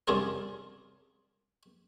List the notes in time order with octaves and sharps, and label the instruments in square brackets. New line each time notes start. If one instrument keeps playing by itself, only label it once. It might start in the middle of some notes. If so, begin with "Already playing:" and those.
[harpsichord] C2 F#2 D4 F4 G#4 A#4